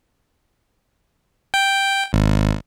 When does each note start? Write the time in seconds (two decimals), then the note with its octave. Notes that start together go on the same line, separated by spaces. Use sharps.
1.54 G5
2.13 G#1